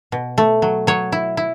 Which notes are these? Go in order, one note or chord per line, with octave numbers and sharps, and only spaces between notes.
B2
A3
F#3
F#3 C#5
E4
E4